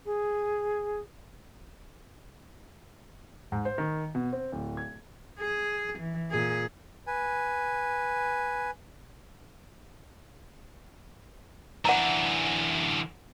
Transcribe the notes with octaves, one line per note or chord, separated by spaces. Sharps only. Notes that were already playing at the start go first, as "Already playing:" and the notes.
G#4
G#2
C5
D#3
B2
C4
D1
G#6
G#4
E3
A#2 G#4
B4 G#5
D3 E3 F#5 A#5